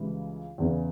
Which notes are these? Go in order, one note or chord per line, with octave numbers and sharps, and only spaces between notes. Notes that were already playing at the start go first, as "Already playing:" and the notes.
Already playing: C#2 C#3 E3 G3
E2 C#3 E3